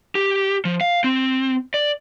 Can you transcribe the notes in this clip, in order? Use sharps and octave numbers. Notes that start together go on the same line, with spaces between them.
G4
F3
F5
C4
D5